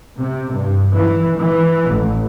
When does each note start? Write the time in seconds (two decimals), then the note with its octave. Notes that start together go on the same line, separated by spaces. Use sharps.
0.19 C3
0.54 G2
0.94 E3
1.38 E3
1.92 A1